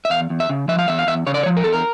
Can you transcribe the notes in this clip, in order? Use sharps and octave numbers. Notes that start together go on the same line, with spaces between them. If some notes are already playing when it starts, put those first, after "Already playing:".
E5
E2 F5
E2
E5
C#3
F3 E5
F5
E2 E5
F5
E2 E5
C#3 C#5
D5
C#5
F3
A#4
E2 A4
A#4